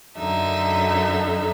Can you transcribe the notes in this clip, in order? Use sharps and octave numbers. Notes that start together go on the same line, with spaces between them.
F#2 D3 D#4 E5